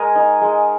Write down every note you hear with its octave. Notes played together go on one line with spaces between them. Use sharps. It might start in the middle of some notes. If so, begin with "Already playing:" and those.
Already playing: G#3 G#4 A#4
D#4
G#3